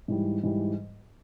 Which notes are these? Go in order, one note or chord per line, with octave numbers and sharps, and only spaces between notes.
G#2 E3 G3
G#2 E3 G3